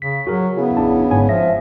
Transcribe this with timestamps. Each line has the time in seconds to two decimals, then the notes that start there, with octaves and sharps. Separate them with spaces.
0.02 C#3 B6
0.27 F#3 F#4 G#4 A#4
0.57 C#3 B3 E4
0.77 A1 D4 A5
1.11 G1 G#2 C#5 G#5
1.29 F3 E5 A#6